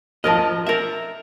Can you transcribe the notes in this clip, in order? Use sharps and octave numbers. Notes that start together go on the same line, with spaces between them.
F3 A#4 D#5 A5 F6
A#4 E5